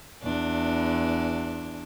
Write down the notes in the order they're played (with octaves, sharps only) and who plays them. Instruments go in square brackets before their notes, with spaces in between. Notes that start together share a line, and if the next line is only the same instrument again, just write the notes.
[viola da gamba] E2 D4